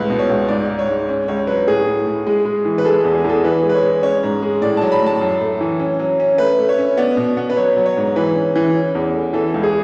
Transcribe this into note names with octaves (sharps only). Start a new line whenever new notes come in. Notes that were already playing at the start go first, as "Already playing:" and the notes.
Already playing: C#2 A2 B4
B2
C#5
C#2
G#2 D5
G#2
C#5
G#2
C#4
C#2 C#5
F#3 B4
A2 G#4
A2
A2
G#3
G#3
E3
B4
G#3 A4
E2
G#4
E2
A4
E3 B4
G#3
B4
C#5
G#3
C#4 C#5
G#2
G#3
A2 D5
F#3 A5
B5
A2 A5
F#2
A3
E3
C#4
F#3
C#4
A3 B4
A3
C#5
C#4
B3 D5
B2
B3
B4
F#3 C#5
F#3
C#5
G#2
E3 B4
C#4
E3
C#4
E2
A3
E3 A4
C#2
G#4